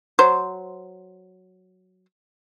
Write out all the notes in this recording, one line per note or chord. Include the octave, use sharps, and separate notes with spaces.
F#3 C5